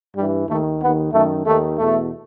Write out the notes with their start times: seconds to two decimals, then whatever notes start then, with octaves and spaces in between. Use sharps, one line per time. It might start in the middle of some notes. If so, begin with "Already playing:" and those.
0.16 G2 E3 G3
0.48 D#2 D#3 A3
0.80 D#2 D#3 B3
1.13 F#2 D#3 A3
1.46 D#2 D#3 A3
1.77 E2 B2 A3